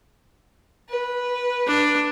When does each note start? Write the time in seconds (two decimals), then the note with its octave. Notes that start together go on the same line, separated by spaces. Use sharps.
0.89 B4
1.67 D4